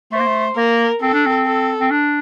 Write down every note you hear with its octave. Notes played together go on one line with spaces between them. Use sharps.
A3 C5
A#3
A3
A#3 A#4
C4 A4
D4
C4
A4
C4
D4